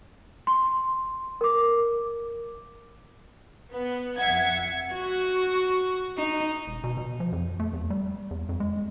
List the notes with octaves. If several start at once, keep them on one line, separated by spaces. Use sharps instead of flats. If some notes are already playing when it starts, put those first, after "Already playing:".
C6
A#4 D6
B3
F2 E5 F#5 G#6
F#4
D#4
E1
B2
B2
F3
F2
A3
E2
G3
E2
F2
G#3